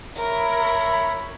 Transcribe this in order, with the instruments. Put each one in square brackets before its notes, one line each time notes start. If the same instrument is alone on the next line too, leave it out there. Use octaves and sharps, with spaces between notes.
[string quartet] A#4 [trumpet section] C#5 E5 B5